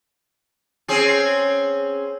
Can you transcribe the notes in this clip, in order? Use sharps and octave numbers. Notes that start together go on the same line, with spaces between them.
C4 C#4 G#4